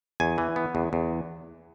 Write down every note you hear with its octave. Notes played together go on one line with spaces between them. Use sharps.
E2 G#5
E3
B3
E2
E2